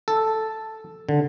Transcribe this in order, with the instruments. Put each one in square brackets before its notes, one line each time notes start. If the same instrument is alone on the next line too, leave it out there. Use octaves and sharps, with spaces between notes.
[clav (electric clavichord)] A4
D3